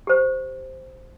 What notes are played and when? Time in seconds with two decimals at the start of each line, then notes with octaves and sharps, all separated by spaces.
0.07 G4 C5